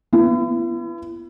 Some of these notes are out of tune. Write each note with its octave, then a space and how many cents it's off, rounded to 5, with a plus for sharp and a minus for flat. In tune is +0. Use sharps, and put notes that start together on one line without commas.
B3 +0 E4 +40